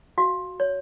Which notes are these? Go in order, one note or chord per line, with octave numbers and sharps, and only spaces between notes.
F#4 F5
C#5